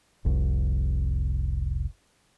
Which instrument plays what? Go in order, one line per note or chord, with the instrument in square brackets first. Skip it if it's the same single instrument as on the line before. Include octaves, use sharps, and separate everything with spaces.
[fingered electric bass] F1 C2